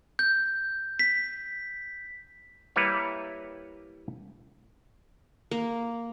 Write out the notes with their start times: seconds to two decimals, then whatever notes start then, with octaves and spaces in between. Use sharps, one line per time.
0.19 G6
0.99 B6
2.76 G3 A#3 E4 B4 C#5
5.51 A#3